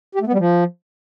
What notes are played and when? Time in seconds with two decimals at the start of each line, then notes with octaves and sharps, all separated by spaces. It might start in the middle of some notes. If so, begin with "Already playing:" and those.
0.15 G4
0.21 A3
0.27 B3
0.33 G3
0.39 F3